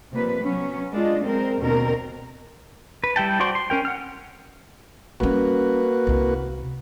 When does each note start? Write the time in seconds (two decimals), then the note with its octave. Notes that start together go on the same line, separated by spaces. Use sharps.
0.11 C3 F3 G3 A#3 B4
0.41 F#3 B3 C#4
0.92 G#3 D4 F4 D#5
1.25 G#3 C4 A#4 C5
1.59 D#2 B2 D3 A#3 C4 A#4
3.04 B4
3.16 G3 E4 G5 A5
3.40 F#4 C5 D5 C6 C#6
3.55 C6
3.70 C#4 A#4 G5
3.85 F#5 F6
5.20 G3 A#3 C#4 F#4 B4
6.07 C2 C3